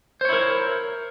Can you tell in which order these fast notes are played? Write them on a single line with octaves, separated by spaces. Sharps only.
C5 C#5 E4 A#4